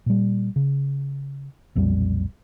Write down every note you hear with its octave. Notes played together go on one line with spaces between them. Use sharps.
A#2 G3
C#3
B1 F2 A#2 G3